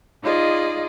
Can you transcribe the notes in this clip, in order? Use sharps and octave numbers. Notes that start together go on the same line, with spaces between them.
D#4 F4 G#4 D5 D#5